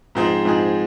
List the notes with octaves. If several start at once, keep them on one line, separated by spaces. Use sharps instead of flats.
G#2 F3 C4 D#4 G#4
G#2 F3 C4 D#4 G#4